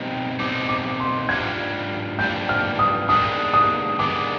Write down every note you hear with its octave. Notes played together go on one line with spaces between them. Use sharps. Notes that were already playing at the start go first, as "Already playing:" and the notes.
Already playing: B2 G3 C4 D#4 G5
B2 G3 C4 D#4 D6
D6
C6
G#2 G3 D4 F4 G#6
G#2 G3 D4 F4 G6
F6
D#6
D#3 G#3 B3 D4 D#6
D#6
D#3 G#3 B3 D4 D6